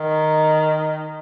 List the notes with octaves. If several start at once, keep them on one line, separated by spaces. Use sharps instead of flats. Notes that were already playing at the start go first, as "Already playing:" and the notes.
Already playing: D#3